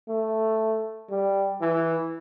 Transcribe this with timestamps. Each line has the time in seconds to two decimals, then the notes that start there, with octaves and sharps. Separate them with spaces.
0.09 A3
1.10 G3
1.61 E3